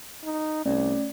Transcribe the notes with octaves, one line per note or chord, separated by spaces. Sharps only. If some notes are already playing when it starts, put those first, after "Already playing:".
D#4
C2 A3 C#4 D5